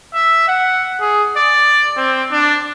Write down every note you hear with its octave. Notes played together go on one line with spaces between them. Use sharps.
E5
F#5
G#4
D5
C4
D4